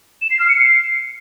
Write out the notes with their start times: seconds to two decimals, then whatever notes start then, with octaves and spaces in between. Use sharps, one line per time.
0.21 E7
0.30 C7
0.39 F6
0.48 C#7
0.57 C7